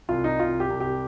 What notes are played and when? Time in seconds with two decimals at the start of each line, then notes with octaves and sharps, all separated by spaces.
0.09 C2 F4
0.24 D#4
0.40 C2 F4
0.60 G4
0.70 C2
0.80 G4